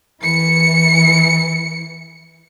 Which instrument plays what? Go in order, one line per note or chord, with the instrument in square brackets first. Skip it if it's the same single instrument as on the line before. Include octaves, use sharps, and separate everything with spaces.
[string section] E3 C#7